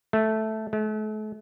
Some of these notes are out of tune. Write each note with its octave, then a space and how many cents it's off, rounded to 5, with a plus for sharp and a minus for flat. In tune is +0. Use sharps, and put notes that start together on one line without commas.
A3 -5
A3 -40